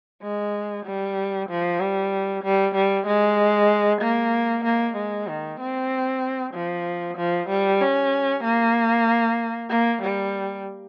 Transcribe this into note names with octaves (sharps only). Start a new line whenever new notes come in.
G#3
G3
F3
G3
G3
G3
G#3
A#3
A#3
G#3
D#3
C4
F3
F3
G3
C#4
A#3
A#3
G3